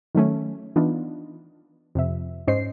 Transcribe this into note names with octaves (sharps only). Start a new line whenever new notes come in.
D#3 F#3 A3 C#4
E3 B3 D4 D#4 F4
F2 C3 E5
G#2 C#4 C5 D#5 C7